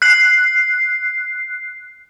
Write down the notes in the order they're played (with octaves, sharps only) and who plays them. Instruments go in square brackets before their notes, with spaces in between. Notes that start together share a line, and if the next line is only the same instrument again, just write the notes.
[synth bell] F#6 C7